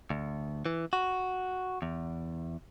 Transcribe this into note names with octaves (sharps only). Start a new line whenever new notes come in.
D2
E3
F#4
E2